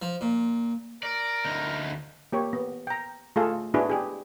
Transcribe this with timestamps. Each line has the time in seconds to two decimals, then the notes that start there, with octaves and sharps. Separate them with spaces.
0.02 F3
0.21 A#2
1.03 A#4 D5
1.45 D2 D#4
2.32 A#3 G4 C#5
2.53 B3
2.87 G5 A#5
3.36 A3 F4 G#4 A4 F5
3.74 B3 D4 E4 F#4 G#4 B4
3.90 G4 G#4